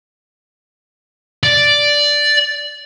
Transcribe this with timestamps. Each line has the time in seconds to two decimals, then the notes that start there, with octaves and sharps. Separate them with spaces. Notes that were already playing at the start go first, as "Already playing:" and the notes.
1.43 D5